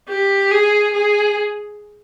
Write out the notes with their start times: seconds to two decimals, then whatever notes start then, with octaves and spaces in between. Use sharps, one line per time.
0.09 G4
0.51 G#4
0.93 G#4